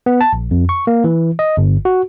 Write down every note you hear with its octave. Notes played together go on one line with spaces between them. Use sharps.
B3
A5
A#1
F2
C#6
A#3
E3
D#5
G1
F#4